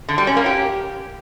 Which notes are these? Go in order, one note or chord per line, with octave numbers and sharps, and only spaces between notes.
D3
G3
C#4
A#3
G4